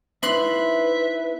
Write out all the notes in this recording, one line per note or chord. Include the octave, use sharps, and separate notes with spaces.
C4 D#4 E4 B4 E5 B5 C6 F#6